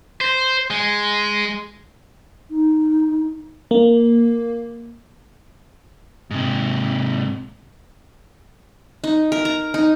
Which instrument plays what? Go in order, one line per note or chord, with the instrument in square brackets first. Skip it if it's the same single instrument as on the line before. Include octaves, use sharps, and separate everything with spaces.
[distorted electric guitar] C5
G#3
[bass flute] D#4
[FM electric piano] A#3
[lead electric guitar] G#2 C3
[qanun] D#4
A#4
A#5
D#4